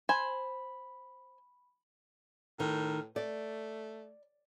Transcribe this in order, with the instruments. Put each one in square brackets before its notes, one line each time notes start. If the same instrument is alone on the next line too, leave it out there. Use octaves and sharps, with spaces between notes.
[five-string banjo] C5 G#5 [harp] B5
[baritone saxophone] A2 [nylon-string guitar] D#3
[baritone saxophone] A3 [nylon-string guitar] D5